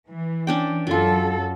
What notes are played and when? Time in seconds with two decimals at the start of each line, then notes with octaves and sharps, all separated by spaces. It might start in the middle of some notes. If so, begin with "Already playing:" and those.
0.10 E3
0.47 C#4 D4 G5
0.87 F#2 F#3 F4 A4